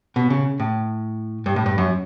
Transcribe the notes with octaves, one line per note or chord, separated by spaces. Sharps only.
B2
C#3
A2
G2
A2
G2
F#2